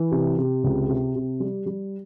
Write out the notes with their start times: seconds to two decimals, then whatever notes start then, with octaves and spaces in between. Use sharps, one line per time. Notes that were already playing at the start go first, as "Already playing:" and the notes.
Already playing: E3
0.12 C3
0.38 C3
0.64 C#2
0.89 C3
1.15 C3
1.40 G3
1.66 G3